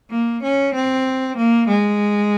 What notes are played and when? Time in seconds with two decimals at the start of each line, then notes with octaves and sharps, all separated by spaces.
0.10 A#3
0.43 C#4
0.74 C4
1.37 A#3
1.68 G#3